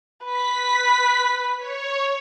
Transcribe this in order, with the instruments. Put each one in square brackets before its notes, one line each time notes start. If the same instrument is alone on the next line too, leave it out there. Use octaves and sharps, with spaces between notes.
[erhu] B4 [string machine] B6
[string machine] C#5